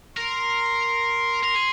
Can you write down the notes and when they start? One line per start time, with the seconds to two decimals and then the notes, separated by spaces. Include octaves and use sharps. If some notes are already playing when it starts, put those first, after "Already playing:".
0.17 A#4 C6
1.43 A#4
1.55 G#4